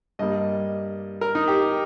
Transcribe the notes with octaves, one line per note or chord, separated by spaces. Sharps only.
G2 G3 A#3 D#5
A#4
D#4
G4